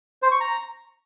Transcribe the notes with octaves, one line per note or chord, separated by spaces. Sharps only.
C5
C#6
A#5